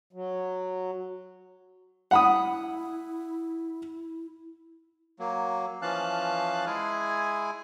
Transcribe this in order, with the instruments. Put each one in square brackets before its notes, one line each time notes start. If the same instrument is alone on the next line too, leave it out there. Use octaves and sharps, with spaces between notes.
[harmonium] F#3
[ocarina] E4 [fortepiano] F#5 B5 D#6
[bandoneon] F#3 A#3
E3 F3 C#4 F5 A5 F#6
G#3 E4 G#4 G#5